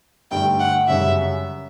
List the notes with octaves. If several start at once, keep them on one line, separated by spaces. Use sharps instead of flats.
G2 D3 A3 G5
F#5
F#2 C#3 G3 C#4 E5